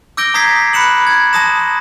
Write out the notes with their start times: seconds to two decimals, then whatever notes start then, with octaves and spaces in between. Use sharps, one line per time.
0.17 D6 E6 G6 A#6 D7 G7
0.34 A#5 D#6 G#6 B6 C7
0.73 B5 F#6 C#7 E7 F#7
1.07 G#6
1.33 A5 C6 D#6 A#6 E7